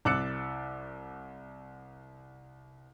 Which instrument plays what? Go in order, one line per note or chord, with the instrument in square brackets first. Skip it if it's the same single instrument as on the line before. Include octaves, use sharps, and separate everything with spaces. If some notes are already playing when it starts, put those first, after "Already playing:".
[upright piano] C2 D6 E6 F#6 A6 C#7